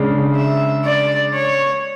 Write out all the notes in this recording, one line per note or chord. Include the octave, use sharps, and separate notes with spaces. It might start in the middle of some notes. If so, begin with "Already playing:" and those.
Already playing: C#3 G#3 D4
E5
D5
C#5